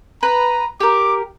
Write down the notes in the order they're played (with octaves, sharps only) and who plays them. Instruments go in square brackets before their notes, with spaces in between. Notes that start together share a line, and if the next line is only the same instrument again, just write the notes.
[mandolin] B4 [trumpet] A#5
[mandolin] G4 A#4 [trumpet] D6